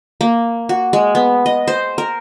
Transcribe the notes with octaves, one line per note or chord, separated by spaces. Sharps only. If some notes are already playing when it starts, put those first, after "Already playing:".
A#3
F#4
G#3
B3
D#5
C5
A#4